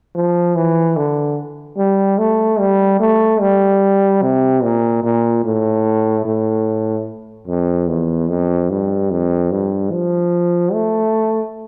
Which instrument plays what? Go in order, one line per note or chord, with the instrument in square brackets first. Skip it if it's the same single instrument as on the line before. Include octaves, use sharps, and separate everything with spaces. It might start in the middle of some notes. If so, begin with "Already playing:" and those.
[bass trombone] F3
E3
D3
G3
A3
G3
A3
G3
C3
A#2
A#2
A2
A2
F2
E2
F2
G2
F2
G2
F3
A3